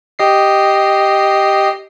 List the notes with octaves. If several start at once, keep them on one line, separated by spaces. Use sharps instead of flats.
G4 D#5 C7